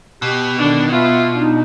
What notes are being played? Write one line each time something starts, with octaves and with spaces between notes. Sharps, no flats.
B2 G4
D3 D#3 D4
B3 F4 E5
D4 D#4